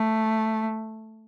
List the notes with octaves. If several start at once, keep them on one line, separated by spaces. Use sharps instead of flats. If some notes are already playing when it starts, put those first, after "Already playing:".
Already playing: A3